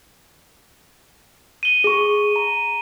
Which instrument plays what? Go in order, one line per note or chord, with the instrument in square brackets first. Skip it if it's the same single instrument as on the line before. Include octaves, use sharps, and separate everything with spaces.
[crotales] D#7 G7
[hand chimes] G#4 C#6
A#5